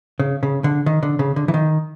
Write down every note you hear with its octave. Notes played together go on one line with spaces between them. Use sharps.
C#3
C#3
D3
D#3
D3
C#3
D3
E3
D#3